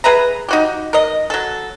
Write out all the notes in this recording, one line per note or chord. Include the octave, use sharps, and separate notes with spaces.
G#4 B4 E5 A#5
D#4 F#4 G4
A#4 D#5
F#3 A4